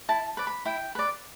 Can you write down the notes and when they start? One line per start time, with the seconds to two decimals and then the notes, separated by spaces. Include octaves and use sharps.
0.09 E4 A5
0.37 B4 D5
0.47 B5
0.65 E4 G5
0.95 B4 D5